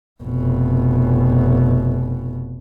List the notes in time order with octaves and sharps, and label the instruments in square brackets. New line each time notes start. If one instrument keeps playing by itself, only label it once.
[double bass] F1 B2